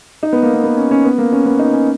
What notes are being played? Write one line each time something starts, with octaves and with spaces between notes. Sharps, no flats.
D#4
B3
A#3
B3
B3
C#4
C#4
B3
A#3
C#4
B3
D#4
C#4